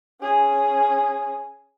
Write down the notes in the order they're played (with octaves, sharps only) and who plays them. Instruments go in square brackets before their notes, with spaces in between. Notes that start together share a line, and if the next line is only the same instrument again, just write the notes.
[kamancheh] C#4 G#4